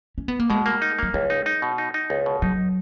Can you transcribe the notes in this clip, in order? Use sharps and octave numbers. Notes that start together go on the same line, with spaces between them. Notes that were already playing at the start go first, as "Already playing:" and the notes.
C#4
B3
A#3
B2 G#3
A#3
D#4
F#3 A#3
C#2 G#3
D#4
D#4
B2
D#4
D#4
C#2
B2
F#3 D#4